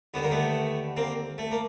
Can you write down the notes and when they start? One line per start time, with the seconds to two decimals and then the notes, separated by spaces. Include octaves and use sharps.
0.14 D#2 D3 B3
0.23 A#3
0.31 A3 B3
0.97 A#3 C4
1.38 A3
1.51 A#3